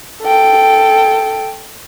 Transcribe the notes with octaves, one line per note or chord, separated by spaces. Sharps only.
A4 G5